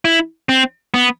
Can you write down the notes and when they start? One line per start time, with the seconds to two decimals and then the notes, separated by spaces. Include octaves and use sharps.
0.05 E4
0.49 C4
0.94 B3